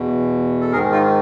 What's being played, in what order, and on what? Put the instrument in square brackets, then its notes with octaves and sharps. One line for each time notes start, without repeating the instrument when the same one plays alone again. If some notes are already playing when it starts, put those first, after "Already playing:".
Already playing: [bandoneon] E2 B2
A4
G#2 G#4 A#4
D#3
D#4 F4